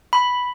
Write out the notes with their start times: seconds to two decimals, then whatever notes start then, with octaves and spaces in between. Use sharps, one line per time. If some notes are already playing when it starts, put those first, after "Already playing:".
0.13 B5